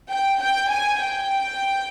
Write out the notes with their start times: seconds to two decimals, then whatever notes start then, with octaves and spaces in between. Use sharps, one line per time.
0.10 G5
0.41 G5
0.70 G#5
1.01 G5